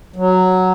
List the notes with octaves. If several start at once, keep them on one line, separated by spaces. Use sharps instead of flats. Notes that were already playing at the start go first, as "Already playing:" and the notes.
F#3